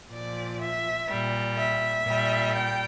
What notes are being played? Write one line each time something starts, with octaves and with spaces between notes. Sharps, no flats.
A#2 F3 D5
E5
A#2 G3
E5
A#2 G3
G5